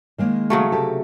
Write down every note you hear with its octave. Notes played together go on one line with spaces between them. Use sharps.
D#3 G#3 A#3
C#3 F#3 A3
C3 G4 A4